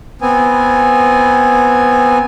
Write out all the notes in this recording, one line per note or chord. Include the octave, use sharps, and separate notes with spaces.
B3 C4 G#5